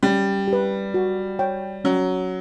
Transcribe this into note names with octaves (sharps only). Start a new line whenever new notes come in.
G3 C#4
G4
B4
F#4
C#5 G5
F#3 C#4